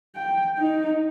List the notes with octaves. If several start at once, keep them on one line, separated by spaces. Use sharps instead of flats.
G5
D#4